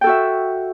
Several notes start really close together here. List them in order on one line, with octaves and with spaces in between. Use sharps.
G5 A4 F#4 E5